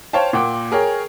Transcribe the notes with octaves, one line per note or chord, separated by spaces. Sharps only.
C5 C#5 F5 G5 A5
A#2 A#3 F#5 G5 D6
G#4 A#4 C#5 G5